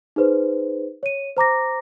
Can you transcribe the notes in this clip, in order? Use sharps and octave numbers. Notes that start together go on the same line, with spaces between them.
D#4 G#4 B4 C5
C#5 D#7
C5 A#5 D6 A#6